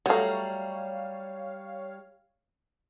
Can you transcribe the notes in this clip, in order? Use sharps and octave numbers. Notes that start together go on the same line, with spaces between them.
F#3 G3 A3 C#5 F5 A#5